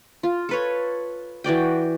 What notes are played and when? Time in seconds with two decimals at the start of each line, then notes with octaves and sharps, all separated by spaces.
0.23 F4
0.49 A4 B4 C#5
1.44 E3 F#4 D5 G5